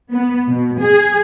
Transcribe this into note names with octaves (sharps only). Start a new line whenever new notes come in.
B3
B2
G#4